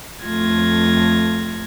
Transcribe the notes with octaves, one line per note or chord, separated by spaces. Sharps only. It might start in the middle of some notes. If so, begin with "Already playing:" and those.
F2 A3 F4 G#6 A#6